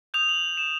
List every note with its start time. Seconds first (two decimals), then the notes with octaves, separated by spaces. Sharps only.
0.14 D#6 G6 F7
0.29 F#7
0.57 E7